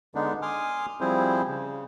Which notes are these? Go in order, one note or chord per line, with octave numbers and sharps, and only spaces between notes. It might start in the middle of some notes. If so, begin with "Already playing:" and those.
D3 G#3 B3 D4 D#4
G#5 C6 D6 D#6 F6
F3 G3 C4 E4 G#4 C5
C#3